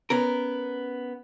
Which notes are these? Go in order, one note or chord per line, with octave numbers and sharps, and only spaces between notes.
B3 C#4 A#4